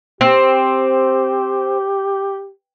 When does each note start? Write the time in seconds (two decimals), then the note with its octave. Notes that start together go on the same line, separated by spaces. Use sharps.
0.21 C4 G4